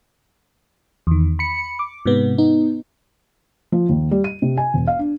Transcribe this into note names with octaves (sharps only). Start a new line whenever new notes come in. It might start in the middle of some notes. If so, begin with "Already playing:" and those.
E2 D#3
B5 C#7
D6
G#2 C3 B3
B3 D#4
F3
D#2
G3
D#7
C3
G#5
E1
F5
D4